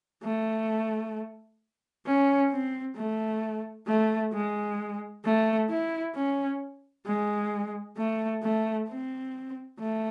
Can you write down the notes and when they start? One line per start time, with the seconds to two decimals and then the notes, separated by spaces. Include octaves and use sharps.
0.23 A3
2.06 C#4
2.51 C4
2.96 A3
3.87 A3
4.33 G#3
5.25 A3
5.69 E4
6.15 C#4
7.06 G#3
7.97 A3
8.43 A3
8.89 C4
9.80 A3